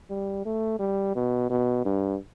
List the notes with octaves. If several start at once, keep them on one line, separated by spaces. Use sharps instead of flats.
G3
A3
G3
B2
B2
G2